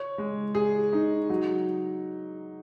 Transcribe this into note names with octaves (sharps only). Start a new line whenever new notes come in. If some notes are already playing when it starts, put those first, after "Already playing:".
Already playing: C#5
G#3
G#4
D#4
F#3